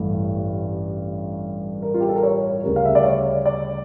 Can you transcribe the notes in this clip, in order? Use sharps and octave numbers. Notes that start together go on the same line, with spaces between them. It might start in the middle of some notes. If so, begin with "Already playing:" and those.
Already playing: A1 G2 E3 A3
A#4
F4
G4
A4
A#4
C#5
D2 C#3 G3 A#4
F5
E5
D5
C#5
D5